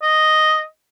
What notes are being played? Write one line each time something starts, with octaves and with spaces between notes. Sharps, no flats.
D#5